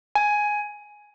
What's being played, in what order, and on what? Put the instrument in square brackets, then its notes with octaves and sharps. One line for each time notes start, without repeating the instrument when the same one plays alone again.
[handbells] G#5